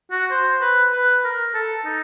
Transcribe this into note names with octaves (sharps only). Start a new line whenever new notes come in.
F#4
C5
B4
B4
A#4
A4
D#4